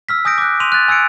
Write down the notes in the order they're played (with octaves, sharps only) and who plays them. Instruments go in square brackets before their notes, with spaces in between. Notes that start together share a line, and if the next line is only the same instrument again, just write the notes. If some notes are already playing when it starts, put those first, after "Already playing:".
[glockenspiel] E6 F6 B6
G#5 D#6 G6 A#6 D7
D6 F#6
C6 D#7 F7
F#6 A6
G#5 E6 G#6 C#7 D7